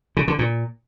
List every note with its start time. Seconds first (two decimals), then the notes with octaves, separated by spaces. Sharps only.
0.17 C#3
0.28 D3
0.39 A#2